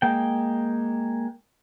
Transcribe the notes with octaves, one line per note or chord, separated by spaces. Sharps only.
G#3 A#3 G5